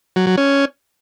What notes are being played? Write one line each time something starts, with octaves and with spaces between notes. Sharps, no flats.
F#3
F#3
C#4